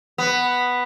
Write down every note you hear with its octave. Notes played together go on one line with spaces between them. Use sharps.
B3